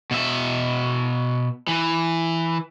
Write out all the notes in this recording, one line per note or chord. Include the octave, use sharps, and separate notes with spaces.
B2 E5
E3